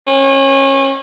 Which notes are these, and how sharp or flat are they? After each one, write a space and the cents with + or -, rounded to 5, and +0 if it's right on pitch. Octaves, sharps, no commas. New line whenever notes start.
C#4 -30